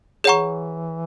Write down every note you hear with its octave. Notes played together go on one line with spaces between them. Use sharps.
E3 G#4 C#5 F#5 A#5 C#6